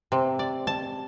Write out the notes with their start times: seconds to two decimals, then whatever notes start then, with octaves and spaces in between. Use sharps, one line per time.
0.12 C3
0.39 D5
0.67 A5